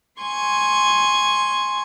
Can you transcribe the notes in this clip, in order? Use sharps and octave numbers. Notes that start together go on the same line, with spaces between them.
G#5 C6 C#6 G#6